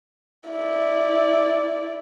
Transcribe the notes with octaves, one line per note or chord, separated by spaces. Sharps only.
E4 D5